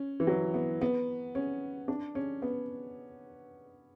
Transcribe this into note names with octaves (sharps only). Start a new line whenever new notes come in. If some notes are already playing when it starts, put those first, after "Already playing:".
Already playing: C#4
E3
F#3
B3
B3
C#4
D4
C#4
B3